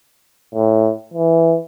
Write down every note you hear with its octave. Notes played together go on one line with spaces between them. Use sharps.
A2
E3